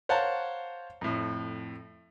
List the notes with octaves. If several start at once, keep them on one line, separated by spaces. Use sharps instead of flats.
C5 C#5 F5 F#5 A5 A#5
F2 A2